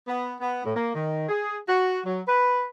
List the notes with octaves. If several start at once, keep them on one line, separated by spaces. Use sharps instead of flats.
B3
B3
A2
A#3
D#3
G#4
F#4
F#3
B4